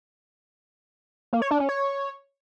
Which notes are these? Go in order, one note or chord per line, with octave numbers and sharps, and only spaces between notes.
A#3
C#5
D4
C#4
C#5